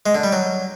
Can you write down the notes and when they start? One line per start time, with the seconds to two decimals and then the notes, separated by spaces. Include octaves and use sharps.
0.06 G#3
0.15 D3
0.24 G3
0.33 F#3